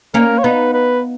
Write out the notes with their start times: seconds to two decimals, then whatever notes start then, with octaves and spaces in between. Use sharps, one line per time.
0.14 A#3 C#4 A#4
0.38 C#5
0.44 B3 D#4 B4
0.74 B4